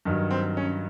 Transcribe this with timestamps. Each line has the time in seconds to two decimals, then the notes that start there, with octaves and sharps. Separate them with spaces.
0.05 G2 D#3 F#3
0.31 C4
0.57 C#4